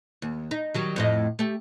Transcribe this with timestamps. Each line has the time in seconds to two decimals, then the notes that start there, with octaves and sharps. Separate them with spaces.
0.22 D#2
0.51 D#4
0.74 D#3 F#3 G3
0.96 F2 A2 D#5
1.39 A3 G4